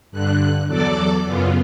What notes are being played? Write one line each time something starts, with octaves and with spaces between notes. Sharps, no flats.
G2 D3 F#6
E2 F#3 A4 D5 D6
F#2 C#3 B3 F4